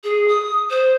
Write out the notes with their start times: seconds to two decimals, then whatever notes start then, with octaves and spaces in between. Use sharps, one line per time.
0.04 G#4
0.28 D#6
0.70 C5